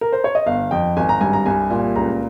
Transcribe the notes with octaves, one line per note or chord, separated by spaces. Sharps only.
A#4
C5
C#5
D#5
G1 F5
F2 G5
G#1 G#5
A#5
G2 G#5
A#5
C2 G#5
A#2
C#2 A#5